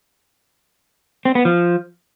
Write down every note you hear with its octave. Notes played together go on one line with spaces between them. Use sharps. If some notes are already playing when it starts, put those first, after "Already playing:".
C4
B3
F3